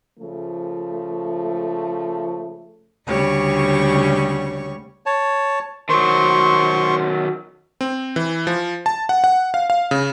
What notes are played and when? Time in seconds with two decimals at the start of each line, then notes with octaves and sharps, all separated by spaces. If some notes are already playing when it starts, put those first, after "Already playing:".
0.19 C#3 F3 A3
3.07 D2 C#3 G3 C#5 C#6
5.06 C#5 A5
5.89 D#3 F#3 C5 C6 C#6
7.81 C4
8.16 E3
8.47 F3
8.86 A5
9.09 F#5
9.24 F#5
9.54 F5
9.70 F5
9.91 C#3